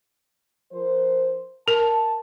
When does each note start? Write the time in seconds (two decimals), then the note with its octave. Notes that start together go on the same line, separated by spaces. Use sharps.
0.72 F3 A#4 C5
1.68 A#4 A5